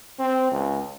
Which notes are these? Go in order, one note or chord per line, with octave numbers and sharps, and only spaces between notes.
C4
C#2